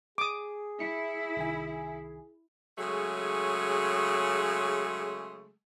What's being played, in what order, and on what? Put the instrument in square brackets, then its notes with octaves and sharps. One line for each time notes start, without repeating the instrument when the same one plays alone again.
[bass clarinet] G#4 [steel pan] D6 D#6
[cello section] E4 [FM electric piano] C#7
[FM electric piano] C2 D#3 G#5
[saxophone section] C#3 F#3 G#3 A3 G#4